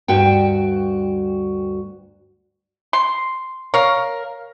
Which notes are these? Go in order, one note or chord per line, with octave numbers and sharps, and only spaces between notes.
D2 G2 F#4 G5
C6
A#4 C#5 F5